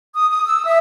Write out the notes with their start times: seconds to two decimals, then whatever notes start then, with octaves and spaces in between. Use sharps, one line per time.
0.14 D#6
0.29 D#6
0.46 E6
0.66 E5